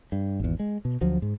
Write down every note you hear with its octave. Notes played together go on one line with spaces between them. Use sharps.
G2
G#1 E2
G#3
B2
D2 F3 F#3
G#2